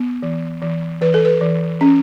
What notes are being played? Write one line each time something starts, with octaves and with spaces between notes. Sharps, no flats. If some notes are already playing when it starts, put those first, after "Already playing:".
Already playing: B3
E3
E3
E3 B4
A4
B4
E3
C#4